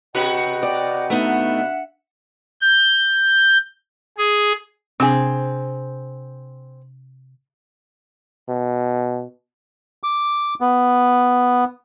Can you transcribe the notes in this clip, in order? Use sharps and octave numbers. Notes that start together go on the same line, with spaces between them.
C3 F#4 B4 D#5 F#5 G5
D5
A3 B3 D4 D#4 E5 F#5
G6
G#4
C3 C4 D4 G#4
B2
D6
B3